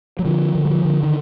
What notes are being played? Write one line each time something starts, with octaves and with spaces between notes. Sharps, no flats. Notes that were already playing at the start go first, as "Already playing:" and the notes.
F#3
D3 F3
D3
F#3
F3
D3
D#3